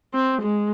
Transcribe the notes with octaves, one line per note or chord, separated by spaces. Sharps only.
C4
G#3